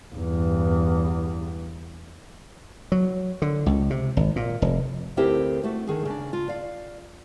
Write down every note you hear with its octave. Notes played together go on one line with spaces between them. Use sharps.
E2 G2
F#3
D3
C#2
C3
G#1
A#2
F1
D2 C4 E4 G4 A#4 C5
A3 F#4
D3 D#3 G#4
C#3 D4
F4
F4 D5 F5